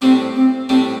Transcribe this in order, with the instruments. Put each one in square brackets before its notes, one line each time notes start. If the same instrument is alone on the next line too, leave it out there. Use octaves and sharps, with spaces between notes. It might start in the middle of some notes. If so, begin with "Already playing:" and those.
[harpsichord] A2 G3 D4 [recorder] C4
[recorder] C4
[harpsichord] A2 G3 D4 [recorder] C4